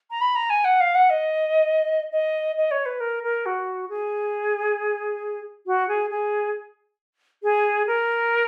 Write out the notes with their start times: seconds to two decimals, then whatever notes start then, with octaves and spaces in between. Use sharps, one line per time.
0.10 A#5
0.21 B5
0.35 A#5
0.50 G#5
0.64 F#5
0.80 F5
0.95 F#5
1.10 D#5
2.12 D#5
2.57 D#5
2.71 C#5
2.85 B4
3.00 A#4
3.23 A#4
3.45 F#4
3.89 G#4
5.66 F#4
5.88 G#4
6.10 G#4
7.43 G#4
7.87 A#4